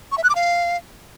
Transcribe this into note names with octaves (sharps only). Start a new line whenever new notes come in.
C#6
E5
F#6
D6
F5